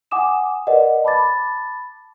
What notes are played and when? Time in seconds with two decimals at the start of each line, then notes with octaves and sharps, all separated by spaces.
0.11 F#5 G#5 D6 D#6 E7
0.67 A#4 B4 D5 D#5 F#5
1.04 A5 B5 D6 A6